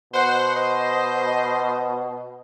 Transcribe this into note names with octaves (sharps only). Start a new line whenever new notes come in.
B2 C5 F#5
C5 D#5